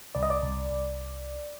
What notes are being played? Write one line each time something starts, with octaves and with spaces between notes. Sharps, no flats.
C2 D5
D#5
D5
C2
C2